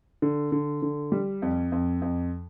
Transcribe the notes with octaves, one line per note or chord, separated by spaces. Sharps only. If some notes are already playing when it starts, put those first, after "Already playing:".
D3
D3
D3
G3
F2
F2
F2